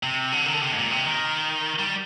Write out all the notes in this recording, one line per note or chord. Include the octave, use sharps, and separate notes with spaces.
C3
D3
D#3
D3
C3
G#2
A#2
C3
D#3
G3